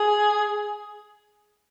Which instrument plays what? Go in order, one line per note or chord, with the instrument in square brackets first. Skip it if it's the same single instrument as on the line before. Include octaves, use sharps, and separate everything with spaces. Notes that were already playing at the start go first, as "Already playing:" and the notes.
Already playing: [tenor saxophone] G#4